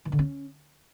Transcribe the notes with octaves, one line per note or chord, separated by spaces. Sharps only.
E3
D3
C#4